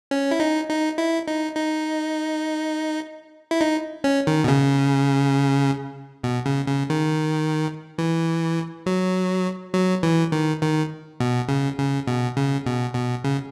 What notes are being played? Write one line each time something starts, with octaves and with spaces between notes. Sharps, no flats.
C#4
E4
D#4
D#4
E4
D#4
D#4
E4
D#4
C#4
D#3
B2
C#3
B2
C#3
C#3
D#3
E3
F#3
F#3
E3
D#3
D#3
B2
C#3
C#3
B2
C#3
B2
B2
C#3